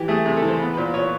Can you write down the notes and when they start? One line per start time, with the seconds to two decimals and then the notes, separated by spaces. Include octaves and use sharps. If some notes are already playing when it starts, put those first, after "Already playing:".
Already playing: E3 G4
0.08 A3 G#4
0.25 C3 G#4
0.37 A4
0.42 E3
0.48 C5
0.60 B3
0.73 B4
0.77 A#2 C5
0.94 A#2 C#5